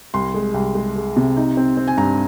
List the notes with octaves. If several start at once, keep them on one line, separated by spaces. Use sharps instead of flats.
C2 C6
G#3
C2
G#3
G#3
C3
D#4
C4
C4
G#5
G2 A#5